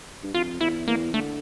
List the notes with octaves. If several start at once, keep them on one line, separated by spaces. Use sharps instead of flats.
G2
F2 F4
E2 E4
E2 A#3
D3 A3